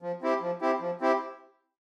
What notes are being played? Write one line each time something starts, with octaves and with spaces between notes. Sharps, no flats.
F3
C4 E4 G4
F3
C4 E4 G4
F3
C4 E4 G4